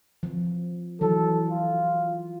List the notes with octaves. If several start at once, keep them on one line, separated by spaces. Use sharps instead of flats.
F3
E3 F#3 A4
F4